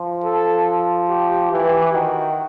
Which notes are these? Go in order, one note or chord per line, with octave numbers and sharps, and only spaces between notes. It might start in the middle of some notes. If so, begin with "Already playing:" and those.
Already playing: F3
A4
G4
E3 G4
D#3 F#4